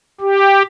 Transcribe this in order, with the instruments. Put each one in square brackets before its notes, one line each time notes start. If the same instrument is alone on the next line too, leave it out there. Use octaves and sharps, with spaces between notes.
[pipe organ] G4